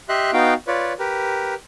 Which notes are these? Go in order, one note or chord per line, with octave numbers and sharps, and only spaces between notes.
G4 D#5 E5 C6 F#6
B3 D#4 F#4 F5 G5
F4 B4 C#5 D5
G4 A#4 B4